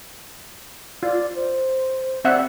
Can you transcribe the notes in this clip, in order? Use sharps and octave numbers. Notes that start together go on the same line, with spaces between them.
F4 D5
C5
C4 D5 E5 F#5